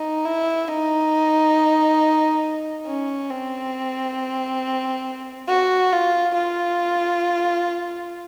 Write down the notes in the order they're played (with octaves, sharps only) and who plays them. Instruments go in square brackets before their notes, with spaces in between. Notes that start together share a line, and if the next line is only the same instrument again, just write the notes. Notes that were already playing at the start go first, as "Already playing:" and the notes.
Already playing: [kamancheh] D#4
E4
D#4
C#4
C4
F#4
F4
F4